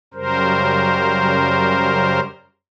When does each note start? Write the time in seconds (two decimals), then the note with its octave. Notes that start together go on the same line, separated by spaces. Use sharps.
0.14 F#2 C#3 G3 A#4 C5